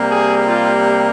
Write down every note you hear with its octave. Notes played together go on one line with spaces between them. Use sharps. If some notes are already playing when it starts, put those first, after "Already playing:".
Already playing: C3 G3 A#3
G#4
F4